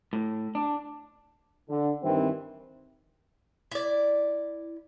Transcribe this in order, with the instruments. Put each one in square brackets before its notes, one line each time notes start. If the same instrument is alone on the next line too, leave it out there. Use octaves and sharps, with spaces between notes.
[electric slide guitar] A2
D4
[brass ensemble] D3
G2 D#3 E3 G3 C4
[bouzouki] E4 D5